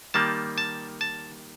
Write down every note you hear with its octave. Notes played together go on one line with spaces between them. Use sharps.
D#3 G3 A#3 A5
A5
A5